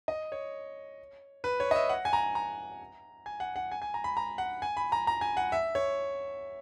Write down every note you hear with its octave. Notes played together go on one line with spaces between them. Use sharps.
D#5
C#5
B4
C#5
D#5
E5
F#5
G#5
A#5
A#5
G#5
F#5
F#5
G#5
G#5
A#5
B5
A#5
F#5
G#5
B5
A#5
A#5
G#5
F#5
E5
C#5